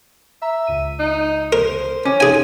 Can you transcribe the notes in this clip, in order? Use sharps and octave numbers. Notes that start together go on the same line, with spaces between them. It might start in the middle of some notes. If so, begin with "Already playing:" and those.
E5 A#5
C#2 D#7
D#4
A#4 C5
C#4 D6
D#4 G#4 G#5 C6